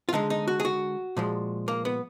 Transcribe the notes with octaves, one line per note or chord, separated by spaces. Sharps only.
F4
D3 G#3 D#4
D#4
F#4
G#4
F#4
A#2 F3 G#3
A#3
B3